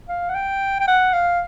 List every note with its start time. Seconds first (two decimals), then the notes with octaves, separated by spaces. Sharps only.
0.09 F5
0.29 F#5
0.35 G5
0.80 G5
0.88 F#5
1.13 F5